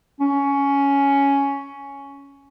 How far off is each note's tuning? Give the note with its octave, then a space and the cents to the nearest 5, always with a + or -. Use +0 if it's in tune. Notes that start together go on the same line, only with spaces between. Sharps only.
C#4 +10